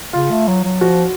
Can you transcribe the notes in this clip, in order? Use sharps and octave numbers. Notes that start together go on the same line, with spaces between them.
C#3 F4
A3
F#3
F#3
F3 F#4